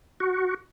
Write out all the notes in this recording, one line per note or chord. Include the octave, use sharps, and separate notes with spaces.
F#4